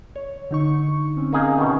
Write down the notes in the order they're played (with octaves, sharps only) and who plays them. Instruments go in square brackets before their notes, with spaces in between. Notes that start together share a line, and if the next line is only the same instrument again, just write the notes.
[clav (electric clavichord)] C#5
[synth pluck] D3 D#4 C#6
C4 C#4
[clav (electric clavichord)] A#3 D#4 G#4
E2 B2 D#3